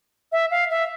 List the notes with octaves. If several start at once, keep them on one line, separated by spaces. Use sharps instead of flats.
E5
F5
E5